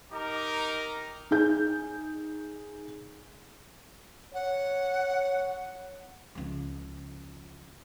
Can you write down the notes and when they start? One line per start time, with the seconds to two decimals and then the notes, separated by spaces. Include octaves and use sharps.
0.13 D#4 G4 A#4 A#5 D6
1.31 D#4 G#4 G6
4.34 C#5 F#5
6.35 C#2 F3